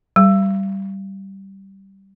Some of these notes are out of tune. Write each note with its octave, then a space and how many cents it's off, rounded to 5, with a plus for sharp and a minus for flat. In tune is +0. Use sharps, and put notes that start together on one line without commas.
G3 -10